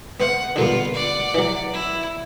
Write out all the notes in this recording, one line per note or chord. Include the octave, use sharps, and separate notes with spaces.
B3 C5 F5 F#5
G2 A#2 D3 B3 F4
D5 F#5
E3 F#3
E4